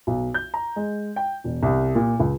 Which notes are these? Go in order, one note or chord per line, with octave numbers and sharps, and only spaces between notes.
B1
G6
A#5
G#3
G5
E1
C2
A#2
C#2